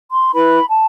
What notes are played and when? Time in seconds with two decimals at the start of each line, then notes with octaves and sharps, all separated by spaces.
0.10 C6
0.34 E4 B4 B5
0.69 A5